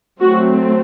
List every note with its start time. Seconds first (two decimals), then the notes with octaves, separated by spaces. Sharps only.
0.21 F#3 A3 C4 F#4